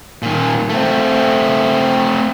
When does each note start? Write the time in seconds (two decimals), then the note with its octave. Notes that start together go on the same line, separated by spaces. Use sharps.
0.22 A#2 D#3
0.70 A3 C4